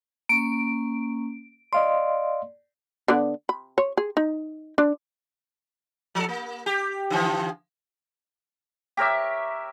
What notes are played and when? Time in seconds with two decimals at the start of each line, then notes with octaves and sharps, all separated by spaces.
0.29 A#3 C#4 D7
1.73 D5 D#5 F5 C6
3.08 D3 B3 D5
3.49 B5
3.78 C#5
3.97 G#4
4.17 D#4
4.78 D4
6.15 F3 A4
6.29 A#3
6.66 G4
7.10 D3 E3 F3
8.97 G4 A#4 C#5 E5